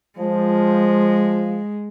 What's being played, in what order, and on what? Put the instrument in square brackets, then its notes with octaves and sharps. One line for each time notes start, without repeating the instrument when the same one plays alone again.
[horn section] F3 [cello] G#3